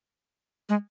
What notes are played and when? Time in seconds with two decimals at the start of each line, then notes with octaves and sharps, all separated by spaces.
0.69 G#3